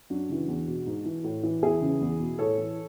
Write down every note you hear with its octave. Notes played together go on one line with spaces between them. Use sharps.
F#2 D4 F#4
C#3 E3
E2
B2
G#2
E3
A2
E3
E2 E4 G#4
C#3 E3
E2
B2
A2 A4 C#5
E3